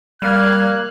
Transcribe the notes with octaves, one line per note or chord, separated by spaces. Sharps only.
G3 A#3 F5 F6 F#6 G#6